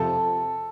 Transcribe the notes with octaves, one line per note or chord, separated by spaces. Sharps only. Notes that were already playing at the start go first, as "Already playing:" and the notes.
Already playing: F2 C3 F3 A4